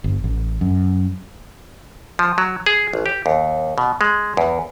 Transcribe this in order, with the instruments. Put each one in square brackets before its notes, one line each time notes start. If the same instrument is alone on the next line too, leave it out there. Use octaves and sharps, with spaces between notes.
[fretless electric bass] G1
A1
F#2
[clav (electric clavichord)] F3
F#3
G#4
A1
G4
D#2
B2
G#3
E2